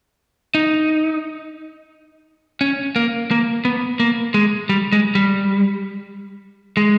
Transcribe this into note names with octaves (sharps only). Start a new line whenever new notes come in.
D#4
C#4
A#3
A#3
B3
A#3
G#3
G3
G#3
G3
G#3